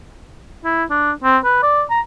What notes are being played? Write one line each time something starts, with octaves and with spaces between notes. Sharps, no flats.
E4
D4
C4
B4
D5
A#5